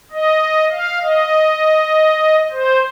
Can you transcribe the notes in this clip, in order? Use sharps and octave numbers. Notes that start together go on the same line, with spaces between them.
D#5
F5
D#5
C5